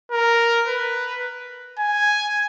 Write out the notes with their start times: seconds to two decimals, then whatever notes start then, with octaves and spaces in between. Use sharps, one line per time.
0.12 A#4
0.68 B4
1.79 G#5